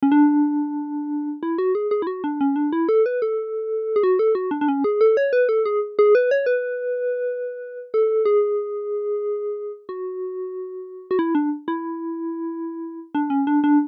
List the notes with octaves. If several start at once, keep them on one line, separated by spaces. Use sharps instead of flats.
C#4
D4
E4
F#4
G#4
G#4
E4
F#4
D4
C#4
D4
E4
A4
B4
A4
G#4
F#4
A4
F#4
D4
D4
C#4
G#4
A4
C#5
B4
A4
G#4
G#4
B4
C#5
B4
A4
G#4
F#4
F#4
E4
D4
E4
D4
C#4
D4
D4